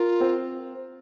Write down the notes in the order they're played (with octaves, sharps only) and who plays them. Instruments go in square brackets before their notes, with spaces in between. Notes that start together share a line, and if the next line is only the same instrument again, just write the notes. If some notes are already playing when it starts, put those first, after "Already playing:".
Already playing: [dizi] F4 [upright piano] A#4
[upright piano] C4